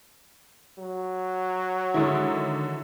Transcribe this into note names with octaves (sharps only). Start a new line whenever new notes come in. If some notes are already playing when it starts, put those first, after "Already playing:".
F#3
D3 D#3 G#3 E4